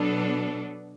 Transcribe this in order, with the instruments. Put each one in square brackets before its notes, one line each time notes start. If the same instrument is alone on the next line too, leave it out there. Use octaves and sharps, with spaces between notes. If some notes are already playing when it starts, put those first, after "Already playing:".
Already playing: [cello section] B2 F#3 B3 D4 A4